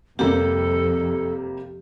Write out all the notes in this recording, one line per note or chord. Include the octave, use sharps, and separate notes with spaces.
F2 C3 G3 A#3 G4 A4